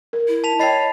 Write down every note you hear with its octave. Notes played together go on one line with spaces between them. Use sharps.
A#4
E4
A5 B6 F7
C#5 D#5 G5 B5 A6 C7